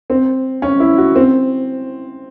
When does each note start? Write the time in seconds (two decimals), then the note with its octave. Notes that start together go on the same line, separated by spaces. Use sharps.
0.10 C4
0.62 C#4
0.80 E4
0.98 F#4
1.15 C4